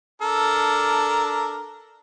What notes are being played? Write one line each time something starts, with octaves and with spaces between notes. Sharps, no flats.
D4 A4 A#4